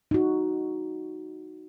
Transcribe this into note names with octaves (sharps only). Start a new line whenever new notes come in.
D#4 F#4